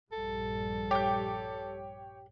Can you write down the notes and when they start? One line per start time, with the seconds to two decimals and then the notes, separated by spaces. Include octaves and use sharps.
0.12 A#1 G2 G3 A4
0.91 G4 C#5 G5 G6